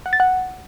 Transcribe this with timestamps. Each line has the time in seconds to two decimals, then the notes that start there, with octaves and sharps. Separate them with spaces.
0.06 F#5
0.13 A6
0.20 F#5